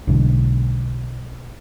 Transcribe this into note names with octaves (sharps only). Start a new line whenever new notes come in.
B1 G#2 D3